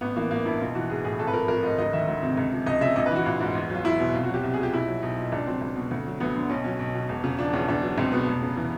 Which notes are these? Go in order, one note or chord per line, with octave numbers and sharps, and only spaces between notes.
A1 B3
E3 A#3
A1 A#3
G2 E4
B1 F4
E3 F#4
B1 G#4
A2 G#4
G#1 A4
B4
F3 A#4
G#1 A#4
G#2 D#5
D2 D#5
D#3 E5
D2
C3
C#2
F3
C#2 D#5
C#3 E5
A#1 D#5
B4
E3 F#4
A#1 F4
G#2
E2
F#3 F4
E2 E4
B2
C2 F4
F#4
F#3
G4
C2
G#4
A#2
G4
B1 E4
F#3
B1 D#4
A#2
C#2 D4
F#3 C4
C#2
B2
D2
F#3
D2 B3
D3
B1 C#4
F#3 C#4
B1
B2
E1
C#3
F3 D4
E2 C#4
C#2 D4
F#3
C#2 C4
B2 B3
F1
C#3
E3